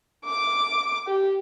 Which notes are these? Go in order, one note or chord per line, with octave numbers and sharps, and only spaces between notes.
D6
G4